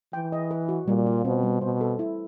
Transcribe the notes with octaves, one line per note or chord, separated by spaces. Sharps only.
E3 G5
D#5
B4
F#4
A#2 G3
F4
B2 C4
G3
B2 C5
A4
E4